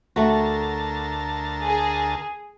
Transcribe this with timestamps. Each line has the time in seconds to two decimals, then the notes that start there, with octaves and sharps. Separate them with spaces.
0.16 D2 A3 F#4 A#4 A5
1.64 G#4